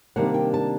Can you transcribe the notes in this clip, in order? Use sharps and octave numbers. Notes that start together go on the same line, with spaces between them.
C3 D#3 G3 A#3 D4 F#5
G5
A5